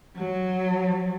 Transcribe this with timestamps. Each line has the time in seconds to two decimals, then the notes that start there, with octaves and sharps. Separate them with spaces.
0.17 F#3